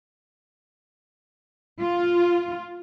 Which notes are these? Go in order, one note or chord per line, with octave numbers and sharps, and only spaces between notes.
F4